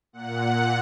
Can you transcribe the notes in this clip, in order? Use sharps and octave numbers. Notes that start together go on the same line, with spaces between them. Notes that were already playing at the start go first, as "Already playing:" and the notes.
A#2 F#5